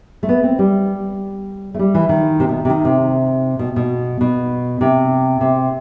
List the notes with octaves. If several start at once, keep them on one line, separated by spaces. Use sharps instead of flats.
A3
B3
C4
G3
A3
G3
E3
D#3
C3
B2
C3
D#3
C3
B2
B2
B2
C3
C3